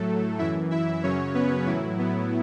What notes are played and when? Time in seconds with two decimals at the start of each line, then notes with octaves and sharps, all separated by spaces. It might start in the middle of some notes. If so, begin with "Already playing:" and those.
Already playing: A2 F#3 A3 A4
0.39 F#2 E3 E4 E5
0.71 E4 E5
1.03 F#2 C#3 F#3 C#4 C#5
1.34 B3 B4
1.66 A2 E3 F#3 E4
1.99 B3